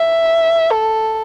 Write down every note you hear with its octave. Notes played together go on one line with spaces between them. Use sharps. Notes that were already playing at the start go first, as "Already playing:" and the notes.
Already playing: E5
A4